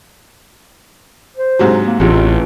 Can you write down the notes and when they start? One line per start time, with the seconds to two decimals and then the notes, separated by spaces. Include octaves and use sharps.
1.36 C5
1.59 G#2 C3 F#3
1.86 A#3
2.00 A1 E2 C3 F4